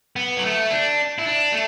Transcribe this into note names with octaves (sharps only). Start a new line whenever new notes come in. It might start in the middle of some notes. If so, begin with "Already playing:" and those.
B3
F#3
A3
D4
E4
D4
A3